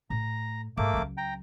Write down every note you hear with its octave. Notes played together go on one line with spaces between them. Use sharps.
A2 A#5
G#2 A3 A#3 D6
C#2 F#3
G5 A#5